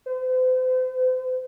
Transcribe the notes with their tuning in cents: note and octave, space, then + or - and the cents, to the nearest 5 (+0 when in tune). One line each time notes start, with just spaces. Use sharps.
C5 -40